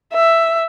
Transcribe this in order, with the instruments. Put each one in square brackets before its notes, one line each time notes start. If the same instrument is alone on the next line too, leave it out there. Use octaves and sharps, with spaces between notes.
[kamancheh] E5